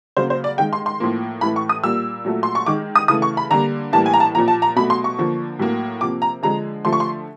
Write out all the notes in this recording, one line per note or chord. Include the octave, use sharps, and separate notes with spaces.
C#3 F#3 A#3 C5
C5
D5
D#3 G#3 G5
C6
C6
A2 F3 A#3
A2 E3 A3 B5
C#6
D#6
A#2 G3 A#3 E6
A#2 F#3 A3
C6
C#6
D#3 G#3 D6
D#6
C#3 E3 A3 D#6
C#6
B5
D3 G3 A#3 A#5
A2 E3 G3 A#3 A5
G#5
A#5
A5
A#2 F3 A#3 A#5
A5
A#5
B2 F#3 A3 B5
C6
C#6
D3 F3 A#3
A2 F#3 A#3
C3 F3 A#3 D6
A#5
D3 F3 G#3 A#5
D3 F3 A3 C6
C#6
C6